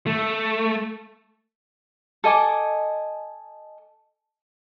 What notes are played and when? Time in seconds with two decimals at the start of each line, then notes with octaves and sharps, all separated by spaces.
0.07 A3
2.24 A4 D#5 G#5 D6